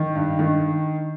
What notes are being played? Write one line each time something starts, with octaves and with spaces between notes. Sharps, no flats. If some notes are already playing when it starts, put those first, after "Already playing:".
Already playing: D#3
G2
D#3